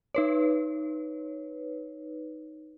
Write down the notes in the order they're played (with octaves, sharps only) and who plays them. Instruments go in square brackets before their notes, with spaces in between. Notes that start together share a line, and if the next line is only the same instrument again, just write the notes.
[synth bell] D#4 B4 C#5